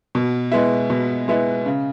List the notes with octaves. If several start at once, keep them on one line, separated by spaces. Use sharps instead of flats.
B2
G#3 B3 E4
B2
G#3 B3 E4
C#3